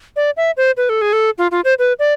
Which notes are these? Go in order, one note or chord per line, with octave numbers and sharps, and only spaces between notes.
D5
E5
C5
B4
A4
G#4
A4
F4
F4
C5
B4
D5